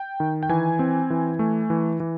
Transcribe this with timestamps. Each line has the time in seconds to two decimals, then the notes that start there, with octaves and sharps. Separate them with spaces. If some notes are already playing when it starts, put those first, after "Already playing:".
Already playing: G5
0.20 D#3
0.43 G5
0.49 E3 G#5
0.79 C4
1.10 E3
1.39 A3
1.70 E3
2.00 E3